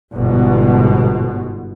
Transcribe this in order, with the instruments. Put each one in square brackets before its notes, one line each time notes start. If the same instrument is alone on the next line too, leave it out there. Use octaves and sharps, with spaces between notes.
[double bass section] G1 G#2 B2